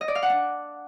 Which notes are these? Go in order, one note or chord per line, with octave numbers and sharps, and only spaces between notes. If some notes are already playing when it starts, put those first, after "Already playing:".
D#5
D5
F5
F#5
D4